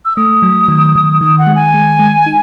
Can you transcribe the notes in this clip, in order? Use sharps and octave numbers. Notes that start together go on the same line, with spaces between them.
E6
A3 D#6
F#3
D#3
D#3
D#3 D#6
F#5
G#3
G#5
G#3
G#3
D#4